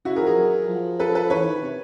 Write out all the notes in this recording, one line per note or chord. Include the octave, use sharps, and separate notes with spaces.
C#3 E4 F#4
G#4 A#4
F3
G#4 A#4
F#3
F3
A4 B4
A4 B4
E3 B4 C#5
D#3
C3